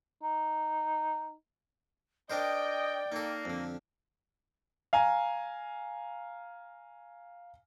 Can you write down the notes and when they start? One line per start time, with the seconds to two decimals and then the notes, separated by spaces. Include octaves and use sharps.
0.23 D#4
2.30 D4 A#4 C5 D5 D#5 G5
3.12 A#3 D#4 A4
3.45 F2 D3
4.93 F5 G#5 A#5